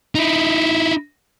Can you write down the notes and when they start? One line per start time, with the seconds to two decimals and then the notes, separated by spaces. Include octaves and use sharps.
0.15 D#4 E4